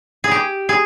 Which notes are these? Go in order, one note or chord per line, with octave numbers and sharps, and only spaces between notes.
G#4
G4
G#4